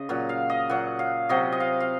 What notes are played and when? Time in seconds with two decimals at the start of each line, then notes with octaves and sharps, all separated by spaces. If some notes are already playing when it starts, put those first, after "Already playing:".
Already playing: C#3 D#5
0.09 A#2 F#3 F#5
0.29 F5
0.50 D#5
0.69 A#2 F#3 F#5
0.99 F5
1.29 C3 F#3 D#5
1.52 D#5
1.60 F5
1.80 F5